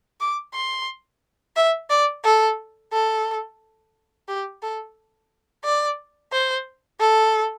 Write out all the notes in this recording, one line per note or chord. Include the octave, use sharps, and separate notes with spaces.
D6
C6
E5
D5
A4
A4
G4
A4
D5
C5
A4